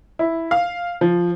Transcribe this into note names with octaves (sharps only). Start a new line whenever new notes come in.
E4
F5
F3